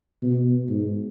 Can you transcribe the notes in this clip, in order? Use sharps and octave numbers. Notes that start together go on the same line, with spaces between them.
B2
G#2